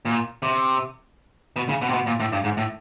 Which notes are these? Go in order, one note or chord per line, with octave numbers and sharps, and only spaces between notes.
A#2
C3
B2
C#3
B2
C3
B2
A#2
A2
G2
G#2
A2